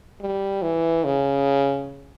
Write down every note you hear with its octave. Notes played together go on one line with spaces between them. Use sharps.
G3
E3
C#3